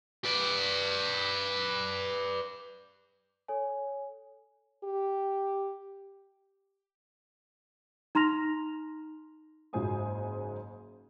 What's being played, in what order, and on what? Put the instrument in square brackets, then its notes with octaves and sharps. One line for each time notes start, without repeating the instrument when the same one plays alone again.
[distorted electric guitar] B4 D5
[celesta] A4 C#5 G#5
[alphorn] G4
[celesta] D#4 A#5 C6 F6 A#6 F7
[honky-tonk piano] F#1 G#2 F#3 C5 G#5 D#6